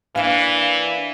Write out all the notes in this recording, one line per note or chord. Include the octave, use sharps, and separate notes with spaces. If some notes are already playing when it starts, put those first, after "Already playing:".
E3 A#3 D4 F5